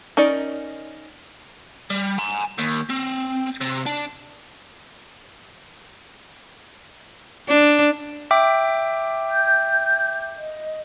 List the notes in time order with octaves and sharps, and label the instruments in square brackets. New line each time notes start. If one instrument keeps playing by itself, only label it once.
[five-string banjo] C#4 D#4 A#4 D5
[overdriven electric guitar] G3
G#5 A#5
D#2
C4
C3
D4
[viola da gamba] D4
[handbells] E5 G5 D6
[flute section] G6
D#5